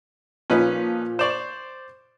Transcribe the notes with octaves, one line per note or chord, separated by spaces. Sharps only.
A#2 F3 C#4 D#4 B4
C5 D5 C#6 E7